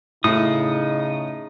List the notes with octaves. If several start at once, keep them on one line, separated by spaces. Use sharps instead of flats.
A2 C#3 D#4 D#6